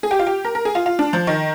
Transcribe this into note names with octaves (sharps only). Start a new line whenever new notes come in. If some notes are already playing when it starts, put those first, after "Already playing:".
G#4
G4
F4
G4
A#4
A#4
G#4
F4
F4
D4
F3
D#3